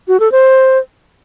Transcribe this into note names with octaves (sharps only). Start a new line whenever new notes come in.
F#4
A4
C5